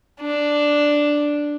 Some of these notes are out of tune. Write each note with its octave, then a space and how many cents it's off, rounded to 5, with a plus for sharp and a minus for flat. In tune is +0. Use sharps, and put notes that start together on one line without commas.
D4 +0